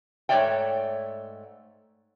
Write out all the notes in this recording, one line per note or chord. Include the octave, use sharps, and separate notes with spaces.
G#2 A3 C#5 D5 E5 G5